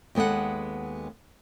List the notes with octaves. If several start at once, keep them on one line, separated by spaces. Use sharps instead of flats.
D#2 G#3 B3 A4 F#5